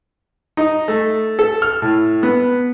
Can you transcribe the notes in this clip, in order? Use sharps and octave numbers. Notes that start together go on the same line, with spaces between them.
D#4
A3
A4
F6
A2
B3